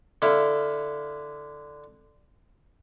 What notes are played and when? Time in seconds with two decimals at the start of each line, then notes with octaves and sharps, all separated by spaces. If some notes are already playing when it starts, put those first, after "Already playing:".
0.22 D3 E4 F5